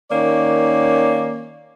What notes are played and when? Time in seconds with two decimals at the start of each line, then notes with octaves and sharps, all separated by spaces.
0.11 D#3 A#3 C#4 D5